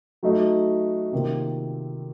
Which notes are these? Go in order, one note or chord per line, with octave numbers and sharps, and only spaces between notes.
F#3 A3 D#4 F#4
C3 D#3 A#3 F4